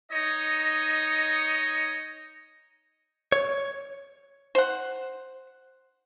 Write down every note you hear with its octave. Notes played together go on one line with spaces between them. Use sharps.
D#4 C#5 D#5
C#5
C5 F#5